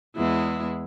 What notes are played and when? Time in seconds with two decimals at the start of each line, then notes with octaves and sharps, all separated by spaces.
0.16 E2 G#3 E4